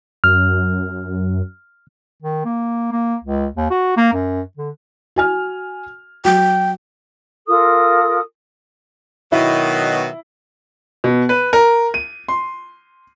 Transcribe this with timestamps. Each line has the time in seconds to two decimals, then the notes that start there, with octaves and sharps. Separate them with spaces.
0.24 F#2 F6
2.23 D#3
2.45 A#3
2.92 A#3
3.24 C#2
3.57 D#2
3.70 F#4
3.97 A#3
4.13 F#2
4.57 D3
5.16 F#4 G#5 F6
6.25 F#3 G5
7.46 F4 A4 A#4 D#6
9.32 B2 D#3 F#3 E4
11.04 B2
11.29 B4
11.53 A#4
11.94 D#7
12.28 C6